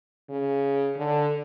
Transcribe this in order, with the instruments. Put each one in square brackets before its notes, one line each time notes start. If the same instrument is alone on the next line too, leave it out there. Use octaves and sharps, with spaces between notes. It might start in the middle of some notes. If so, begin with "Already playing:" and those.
[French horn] C#3
D3